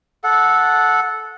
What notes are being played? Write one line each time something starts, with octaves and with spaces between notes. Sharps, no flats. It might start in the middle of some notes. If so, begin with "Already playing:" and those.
A4 F#5